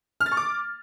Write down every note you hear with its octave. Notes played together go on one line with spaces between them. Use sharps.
F6
A6
C#6
D6